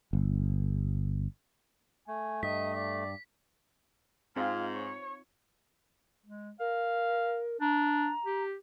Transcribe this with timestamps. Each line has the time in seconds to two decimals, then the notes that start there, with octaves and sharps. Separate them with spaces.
0.13 G1
2.08 A3 G#5
2.43 G2 D#5 B6
2.75 D5
4.36 G#2 C4 D#4 F4 F5
4.74 C#5
6.26 G#3
6.60 A#4 F5
7.61 D4 A#5
8.25 G4